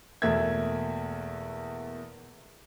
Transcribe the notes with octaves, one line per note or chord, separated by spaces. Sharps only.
E2 B2 A3 A#3 E5 G#6